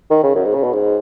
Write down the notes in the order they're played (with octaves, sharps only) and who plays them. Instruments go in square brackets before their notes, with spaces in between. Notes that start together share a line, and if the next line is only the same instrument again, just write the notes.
[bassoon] D#3
C#3
F#2
G#2
C#3
B2
G#2